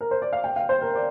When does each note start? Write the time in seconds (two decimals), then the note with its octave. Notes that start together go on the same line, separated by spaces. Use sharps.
0.01 A#4
0.11 C5
0.22 D5
0.33 F5
0.44 G5
0.56 F5
0.69 C5
0.82 A#4
0.95 D5